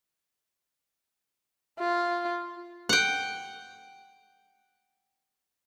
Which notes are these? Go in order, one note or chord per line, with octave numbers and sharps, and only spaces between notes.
F4
F#5 G5